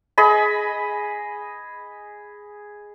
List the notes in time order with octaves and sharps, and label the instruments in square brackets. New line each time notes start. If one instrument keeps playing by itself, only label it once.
[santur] G#4 D#5 B5